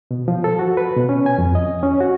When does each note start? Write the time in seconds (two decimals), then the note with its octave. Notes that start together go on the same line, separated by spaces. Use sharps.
0.11 B2
0.28 F3
0.44 A4
0.59 F#4
0.77 B4
0.97 B2
1.09 C#4
1.26 G#5
1.38 F2
1.55 D#5
1.83 C#4
2.00 F#4